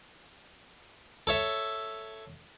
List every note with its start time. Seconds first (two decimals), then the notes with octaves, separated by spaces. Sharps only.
1.27 A4 C#5 E5